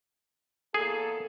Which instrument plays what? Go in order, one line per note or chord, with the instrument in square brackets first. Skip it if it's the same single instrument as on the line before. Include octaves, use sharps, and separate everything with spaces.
[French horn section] E2 A#3 A4 [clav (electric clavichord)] G#4